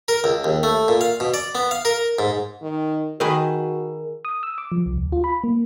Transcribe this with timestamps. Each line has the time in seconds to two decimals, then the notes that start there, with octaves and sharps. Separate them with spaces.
0.08 A#4
0.24 C#2
0.44 D#2
0.63 A3
0.88 A#2
1.01 F5
1.20 B2
1.34 D5
1.55 B3
1.71 F5
1.85 A#4
2.19 G#2
2.62 D#3
3.20 D#3 F#4 G#4 A#4 B4
4.25 D#6
4.43 E6
4.58 D6
4.72 F3
4.86 C2
4.98 D2
5.12 F4
5.24 B5
5.44 A#3